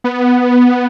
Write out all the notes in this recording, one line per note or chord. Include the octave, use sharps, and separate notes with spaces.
B3